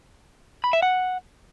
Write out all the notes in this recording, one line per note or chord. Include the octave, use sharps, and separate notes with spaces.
B5
E5
F#5